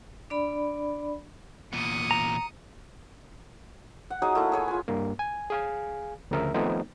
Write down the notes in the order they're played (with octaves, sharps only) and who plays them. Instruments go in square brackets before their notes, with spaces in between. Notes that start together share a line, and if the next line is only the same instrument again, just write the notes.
[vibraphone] D4 D5 B5
[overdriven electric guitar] E2 A#2 [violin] D#6 C#7
[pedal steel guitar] A#5
[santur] F#5
F#3 D#4 G#4
A3 A#3 E4
G#4 C#5 G#5
F4 G#5
[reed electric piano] G2 A#3
G#5
G#4 F5 G#5
D2 C#3 F3 A#4 E5
D#3 F3 A3 B3 C4 D#4